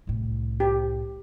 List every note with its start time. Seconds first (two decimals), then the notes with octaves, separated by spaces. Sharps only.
0.07 C2 A2
0.60 G4